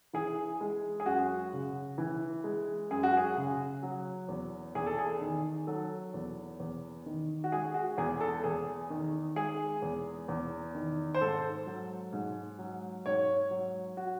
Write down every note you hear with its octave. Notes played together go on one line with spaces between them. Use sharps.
E3 G#4
G#3
G#4
F#2 F#4
C#3
E3
G#3
F#2 G#4
F#4
G#4
C#3
F#3
E2
E2 G#4
A4
G#4
D#3
F#3 A4
E2
E2
D#3
F#4
G#3 G#4
F#4
E2 G#4
A4
E2 G#4
D#3
G#3 G#4
E2
E2
D#3
C5
G#2 A4
F#3
G#2
F#3
G#2 C#5
F#3
F#4